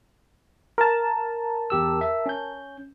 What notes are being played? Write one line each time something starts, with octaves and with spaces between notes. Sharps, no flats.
A#4 A5
E2 G4 E6
E5
C#4 G6